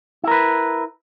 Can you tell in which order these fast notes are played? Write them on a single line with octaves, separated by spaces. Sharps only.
E4 A#4 B4